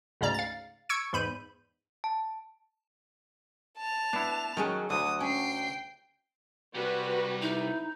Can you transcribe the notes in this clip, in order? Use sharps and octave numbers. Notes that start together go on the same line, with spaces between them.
D2 G#2 C#3 D5 A#5
F5 A6
C#6 E6 G#6 C#7 D7
E2 G#2 B5 G6 D#7
A5
A5 F7
B3 D4 E4
D#3 F#3 C#4 G#4
D2 D3 F#3 D#6
C#4 G5 C7
C3 G3 F#4 B4
D#4 E4